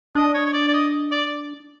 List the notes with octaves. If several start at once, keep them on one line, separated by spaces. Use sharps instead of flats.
D4 D#5
C#5
C#5
D5
D5
D#5
D5